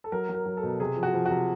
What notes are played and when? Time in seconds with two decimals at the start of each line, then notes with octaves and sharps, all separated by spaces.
0.04 A4
0.12 F#3 A#4
0.29 F#3
0.34 A#4
0.46 F#3
0.57 A4
0.63 B2
0.80 C3 G#4
0.97 F3
1.03 F#4
1.14 F3
1.26 C3 F#4